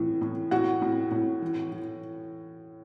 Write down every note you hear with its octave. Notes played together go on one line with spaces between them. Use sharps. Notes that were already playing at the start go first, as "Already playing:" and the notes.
Already playing: A2 E3
A2
A2 F#4 F#5
A2
A2
E3
E3